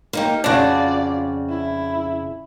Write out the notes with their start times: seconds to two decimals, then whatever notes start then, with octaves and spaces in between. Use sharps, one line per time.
0.13 A#3 D#4 G4
0.44 F2 C#3 D4 F4 F#4 D5
1.50 E4